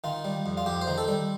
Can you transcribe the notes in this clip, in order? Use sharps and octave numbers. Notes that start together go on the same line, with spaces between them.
D#3 F4
G3
F2
F4
F2 G4
C5
D#3
A4
G3